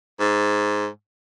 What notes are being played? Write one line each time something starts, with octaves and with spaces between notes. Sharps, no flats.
G#2